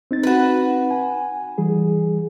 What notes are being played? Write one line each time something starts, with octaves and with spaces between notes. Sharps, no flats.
C4 D#4 A6
F#4 B4
G#5
E3 G3 G#4